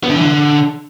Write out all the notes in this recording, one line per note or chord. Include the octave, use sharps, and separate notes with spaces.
B3
D3
E3
D3